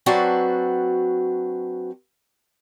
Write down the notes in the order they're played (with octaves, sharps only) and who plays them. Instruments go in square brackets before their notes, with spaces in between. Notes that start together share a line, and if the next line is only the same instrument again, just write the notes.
[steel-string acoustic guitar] F#3 C4 D4 F#4 B4 A5